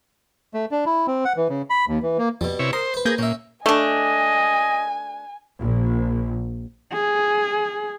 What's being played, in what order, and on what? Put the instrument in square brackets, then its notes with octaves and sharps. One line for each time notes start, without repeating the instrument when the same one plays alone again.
[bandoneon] A3
D4
E4
C4
F#5
E3
C#3
B5
D#2
E3
A#3
[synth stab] F2 [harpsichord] B2 G3
[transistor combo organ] C3 E4 C#5
[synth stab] A#4 [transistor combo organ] C5 [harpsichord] D#6
[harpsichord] B4 C5
[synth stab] A#3 G6 A#6 [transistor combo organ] G#4
[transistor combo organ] A#2 [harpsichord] C#4 E5
[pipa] A3 D4 [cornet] D#5 [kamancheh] G#5
[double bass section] A#1
[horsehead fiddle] G#4